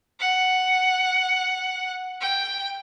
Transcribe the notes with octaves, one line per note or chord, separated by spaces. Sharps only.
F#5
G5